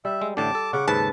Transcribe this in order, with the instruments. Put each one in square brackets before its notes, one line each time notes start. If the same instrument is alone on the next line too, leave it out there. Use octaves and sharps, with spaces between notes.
[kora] G3 [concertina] E5
[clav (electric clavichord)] G#3
[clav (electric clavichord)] A1 A2 D3 [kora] G5 [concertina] A5 D6
[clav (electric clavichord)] A4
[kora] C#3 [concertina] F#5 C#6 D6
[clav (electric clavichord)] D#2 G#2 [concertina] A4 [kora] B4 [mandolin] A5